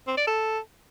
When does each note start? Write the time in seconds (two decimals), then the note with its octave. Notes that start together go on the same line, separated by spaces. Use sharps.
0.07 C4
0.17 D5
0.27 A4